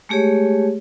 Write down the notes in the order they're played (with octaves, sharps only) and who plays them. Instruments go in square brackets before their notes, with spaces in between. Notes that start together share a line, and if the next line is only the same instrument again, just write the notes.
[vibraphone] G#3 A3 G4 G#4 C#5